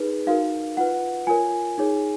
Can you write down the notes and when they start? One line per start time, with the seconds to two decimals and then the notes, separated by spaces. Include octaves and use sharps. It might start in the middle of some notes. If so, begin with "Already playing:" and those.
Already playing: D#4 G#4 B4
0.27 D#4 F#4 A#4 F5
0.77 F4 B4 F#5
1.27 F4 A#4 C#5 G#5
1.78 D#4 G#4 C#5